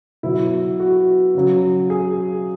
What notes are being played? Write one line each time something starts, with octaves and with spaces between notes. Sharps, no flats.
B2 F#3 E4
F#4
C#3 F#3
G#4